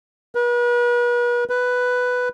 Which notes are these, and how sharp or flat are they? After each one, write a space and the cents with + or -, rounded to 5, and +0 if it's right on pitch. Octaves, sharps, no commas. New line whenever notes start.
B4 -40
B4 +5